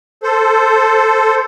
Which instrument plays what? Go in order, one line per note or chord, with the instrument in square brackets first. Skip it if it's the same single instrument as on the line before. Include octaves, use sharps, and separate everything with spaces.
[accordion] A4 C5